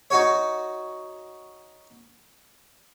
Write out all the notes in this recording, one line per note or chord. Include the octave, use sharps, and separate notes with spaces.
D#4 F#4 C#5